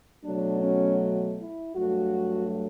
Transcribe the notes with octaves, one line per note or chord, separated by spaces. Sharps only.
B2 F#3 A3 D4
C#4
E4
G2 F#3 A3 F#4